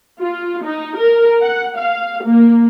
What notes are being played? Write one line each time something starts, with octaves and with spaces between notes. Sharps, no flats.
F4
D#4
A#4
F#5
F5
A#3